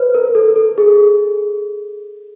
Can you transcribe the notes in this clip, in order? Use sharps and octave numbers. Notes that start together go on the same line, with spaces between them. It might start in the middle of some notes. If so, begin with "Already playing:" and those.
Already playing: B4 C5
A#4
A4
A4
G#4